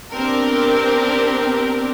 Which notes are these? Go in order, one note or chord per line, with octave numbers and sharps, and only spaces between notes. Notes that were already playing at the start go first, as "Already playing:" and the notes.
B3 C4 D4 G4 A#4